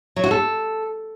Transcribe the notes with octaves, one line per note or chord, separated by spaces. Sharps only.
F#3
F#4
A4